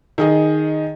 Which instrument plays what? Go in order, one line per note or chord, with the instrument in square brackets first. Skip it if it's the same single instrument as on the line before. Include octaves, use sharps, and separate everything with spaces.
[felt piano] D#3 G#4 D#5